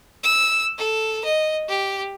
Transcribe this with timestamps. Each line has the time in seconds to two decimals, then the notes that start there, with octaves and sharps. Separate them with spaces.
0.23 E6
0.79 A4
1.25 D#5
1.69 G4